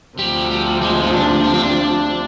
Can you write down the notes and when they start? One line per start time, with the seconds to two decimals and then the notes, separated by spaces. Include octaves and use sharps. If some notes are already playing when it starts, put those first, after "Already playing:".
0.19 D2 C3 F3 G3
0.51 G3
0.82 G#3
1.03 D#4
1.13 D4
1.44 D4
1.54 C4
1.64 D4